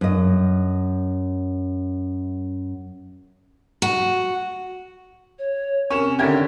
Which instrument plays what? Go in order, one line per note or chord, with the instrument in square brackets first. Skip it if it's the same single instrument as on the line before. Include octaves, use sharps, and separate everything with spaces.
[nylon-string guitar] F#2 D#5
[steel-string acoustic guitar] F#4
[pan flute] C#5
[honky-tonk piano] C3 C#4 [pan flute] A#4 [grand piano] C#6 E7
[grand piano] D3 D#3 C#4 [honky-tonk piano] G4 A#4 G#6 [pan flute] E5